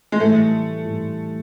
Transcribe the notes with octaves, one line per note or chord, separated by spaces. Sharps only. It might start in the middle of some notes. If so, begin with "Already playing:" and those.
G#3
A2 E3 G3 A3
A2 E3 G3